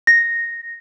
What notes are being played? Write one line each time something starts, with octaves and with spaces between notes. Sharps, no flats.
A#6